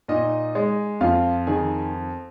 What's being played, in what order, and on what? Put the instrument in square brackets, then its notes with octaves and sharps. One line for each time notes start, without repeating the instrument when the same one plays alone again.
[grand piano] A#2 D#4 D#5
G#3
F2 F4 F5
D#3 G#4 G#5